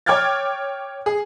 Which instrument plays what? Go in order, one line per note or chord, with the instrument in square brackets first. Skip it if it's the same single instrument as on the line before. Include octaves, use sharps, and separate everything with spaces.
[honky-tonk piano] C#5 G5 D6 F6 G#6 A6
G#4